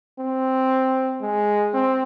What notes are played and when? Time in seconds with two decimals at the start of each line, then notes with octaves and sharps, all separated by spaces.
0.19 C4
1.21 G#3
1.74 C4